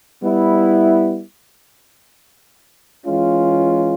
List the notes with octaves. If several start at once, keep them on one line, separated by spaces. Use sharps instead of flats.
G3 B3 E4
E3 G#3 C#4 F4